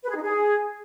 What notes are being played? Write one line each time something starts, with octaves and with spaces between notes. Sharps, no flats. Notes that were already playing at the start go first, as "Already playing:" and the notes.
B4
G#4
D#4
G#4